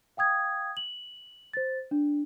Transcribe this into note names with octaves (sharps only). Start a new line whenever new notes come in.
F5 G5 D#6 G#6
F#7
C5 A6
D4